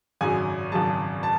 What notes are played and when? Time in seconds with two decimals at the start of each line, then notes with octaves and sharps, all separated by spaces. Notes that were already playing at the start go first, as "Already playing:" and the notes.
0.21 G#1 F#2 C#3 F#3 G#5
0.72 G#1 F#2 C#3 F#3 A5
1.23 A5